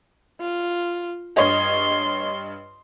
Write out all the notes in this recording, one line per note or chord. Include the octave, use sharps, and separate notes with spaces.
F4
G2 C#5 D#5 C6